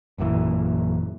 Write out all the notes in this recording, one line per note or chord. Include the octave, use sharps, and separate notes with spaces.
A1 F#2 A#2 E3